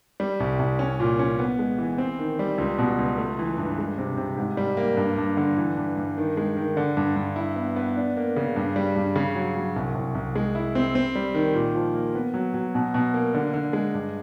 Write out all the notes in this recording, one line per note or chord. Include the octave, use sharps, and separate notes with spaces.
G3
C2
C2
C#4
A#2
C#4
B3
G#3
E3
C4
D#3
G3
C#2
B2
C#2
A3
E3
G2
G#3
C3
C3
G#2
G3
A#3
G2
G2
D3
E3
G2
G2
D#3
G#3
D#3
D3
G2
G2
E4
B3
B3
D4
A#3
C#3
G2
G3
G2
C#3
F#3
F#3
C2
C2
C2
G#3
E4
C4
C4
G3
D#3
A#2
F3
A#3
B3
F#3
F#3
B2
B2
A#3
D3
D3
G#3
G2